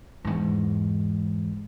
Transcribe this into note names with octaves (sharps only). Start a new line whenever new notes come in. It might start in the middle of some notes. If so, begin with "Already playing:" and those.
E2 G#2